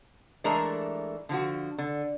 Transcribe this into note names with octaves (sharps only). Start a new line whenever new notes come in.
E3 G#3 A3 D4 A4 A#4
D3 F3 F#4
D3